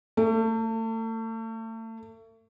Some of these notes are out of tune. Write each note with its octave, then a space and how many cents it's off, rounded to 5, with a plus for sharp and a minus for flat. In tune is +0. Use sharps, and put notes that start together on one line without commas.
A3 +35